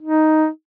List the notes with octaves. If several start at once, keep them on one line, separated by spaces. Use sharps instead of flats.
D#4